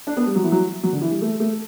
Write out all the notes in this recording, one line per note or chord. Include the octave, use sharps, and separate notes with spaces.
D4
B3
G3
F#3
E3
F#3
F#3
D3
E3
G3
A3
A3